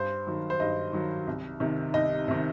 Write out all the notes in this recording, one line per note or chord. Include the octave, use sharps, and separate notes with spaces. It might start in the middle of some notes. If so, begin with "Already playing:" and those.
Already playing: G2 C5
D#3 F#3
C5
G2 D#5
D#3 F#3
C2
C3 D#3
C2 D#5
C3 D#3